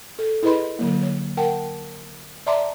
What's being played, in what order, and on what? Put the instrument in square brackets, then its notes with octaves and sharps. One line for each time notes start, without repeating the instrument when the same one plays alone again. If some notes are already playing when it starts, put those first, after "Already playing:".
[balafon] A4
E4 G#4 B4 D#5 B5 C6
D3 F#3 A#3
C#5
A#4 F#5 G5 A5
D5 E5 A5 A#5 C6 D6